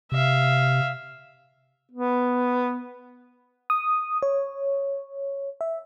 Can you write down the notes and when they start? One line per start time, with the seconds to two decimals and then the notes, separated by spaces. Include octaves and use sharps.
0.12 C3 E5 F5
1.92 B3
3.70 D#6
4.23 C#5
5.61 E5